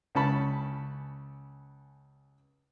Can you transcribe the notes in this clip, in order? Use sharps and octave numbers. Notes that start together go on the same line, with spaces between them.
C#2 C#4 A5 B5